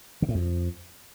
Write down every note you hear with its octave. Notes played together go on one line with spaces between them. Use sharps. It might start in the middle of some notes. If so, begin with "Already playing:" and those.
C#3
A2
F2